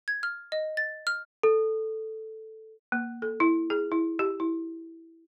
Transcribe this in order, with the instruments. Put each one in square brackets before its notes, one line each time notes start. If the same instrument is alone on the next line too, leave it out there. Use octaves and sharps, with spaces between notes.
[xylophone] G#6
F6
D#5
A6
F6
[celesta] A4
[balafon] A#3
A4
E4
G#4
E4
G4
E4